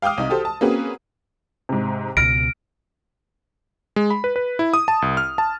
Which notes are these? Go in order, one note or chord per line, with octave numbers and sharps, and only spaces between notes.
F5 G5 D6 D#6 F6
C2 D#4
F#4 G4 A4 C5
A5
A#3 C4 C#4 F#4 G#4 B4
G#2 C3
C#2 B2 F6 A#6 D7
G#3
B5
B4
B4
E4
D#6
A5
C2
F6
A5